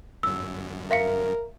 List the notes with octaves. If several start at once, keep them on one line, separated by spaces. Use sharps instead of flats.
G1 F#2 E6
A#4 E5 F5 C#7